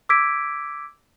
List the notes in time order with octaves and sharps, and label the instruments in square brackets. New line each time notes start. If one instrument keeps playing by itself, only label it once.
[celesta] D6 E6 G#6 B6 D7